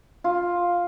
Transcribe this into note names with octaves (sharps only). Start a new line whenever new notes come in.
F4